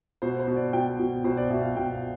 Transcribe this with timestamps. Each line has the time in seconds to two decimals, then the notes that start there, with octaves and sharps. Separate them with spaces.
0.22 B2 C5
0.39 C5
0.48 B2
0.56 D5
0.73 B2 G5
0.99 B2
1.24 B2 C5
1.37 D5
1.50 B2 E5
1.63 F5
1.76 B2 G5
1.93 F5